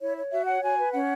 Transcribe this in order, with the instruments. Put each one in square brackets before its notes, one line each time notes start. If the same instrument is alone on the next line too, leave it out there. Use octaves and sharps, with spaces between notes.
[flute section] E4 C#5
C#5
F#4 E5
C#5 F#5
F#4 G#5
B4
C#4 F#5